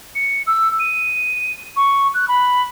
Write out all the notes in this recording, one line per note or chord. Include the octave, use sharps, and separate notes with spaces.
C#7
E6
D#7
C#6
F#6
B5